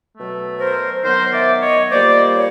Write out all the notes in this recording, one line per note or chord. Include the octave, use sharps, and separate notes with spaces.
B2 F#3 A3
A#4 C5
D#3 F#3 B3 A#4 C5
D5 E5
C#5 D#5
A#2 G3 A#3 C5 D5
C#5